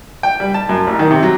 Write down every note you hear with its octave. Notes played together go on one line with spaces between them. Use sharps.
G5
G3
A5
F#2
A1
D#3
C3
F#3